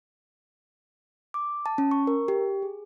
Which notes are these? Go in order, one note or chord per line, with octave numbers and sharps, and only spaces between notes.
D6
A5
C#4
C#6
A#4
G4
G#4